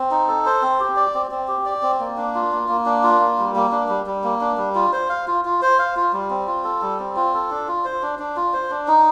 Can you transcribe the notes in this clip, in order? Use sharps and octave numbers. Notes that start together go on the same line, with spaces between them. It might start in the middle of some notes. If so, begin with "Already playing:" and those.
Already playing: C4
D#4
A4
C5
C4
G4
D5
C4
C4
G4
D5
C4
A#3
D4
F4
A#3
A#3
D4
F4
A#3
G3
A#3
D4
G3
G3
A#3
D4
G3
F4
C5
F5
F4
F4
C5
F5
F4
G3
C4
F4
A4
G3
C4
F4
A4
D4
F4
C5
D4
D4
F4
C5
D4
D#4